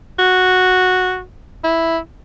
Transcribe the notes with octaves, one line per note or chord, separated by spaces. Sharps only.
F#4
E4